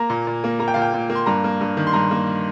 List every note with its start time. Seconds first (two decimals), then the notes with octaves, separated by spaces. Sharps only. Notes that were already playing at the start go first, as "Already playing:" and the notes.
Already playing: A#3 A#5
0.10 A#2
0.27 A#2
0.44 A#3
0.59 A#3 A#5
0.68 G5
0.74 A#2 F5
0.82 G5
0.94 A#2
1.10 A#3
1.15 C6
1.26 G2 A#5
1.44 A#3
1.61 G2
1.77 D#3
1.87 C6
1.93 G2 A#5
2.11 A#3